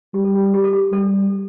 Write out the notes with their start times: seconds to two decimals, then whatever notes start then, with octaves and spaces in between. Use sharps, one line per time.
0.14 G3 G4
0.24 A4
0.35 G4
0.45 A4
0.54 G4
0.64 A4
0.73 G4
0.92 G3 A4